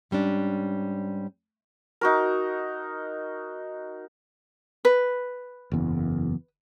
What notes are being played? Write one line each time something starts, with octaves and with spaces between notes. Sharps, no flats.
G#2 G3 C#4 D4
D#4 F#4 A#4
B4
F#1 E2